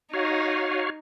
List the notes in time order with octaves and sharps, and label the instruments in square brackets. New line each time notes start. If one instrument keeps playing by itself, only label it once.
[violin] D#4 [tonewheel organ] F#4 C#5 F5